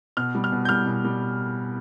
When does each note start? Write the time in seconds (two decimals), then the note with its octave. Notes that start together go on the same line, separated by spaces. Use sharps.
0.17 B2 F6
0.35 G3
0.44 F6
0.52 B2
0.65 G6
0.69 G3 F6
0.86 B2
1.04 G3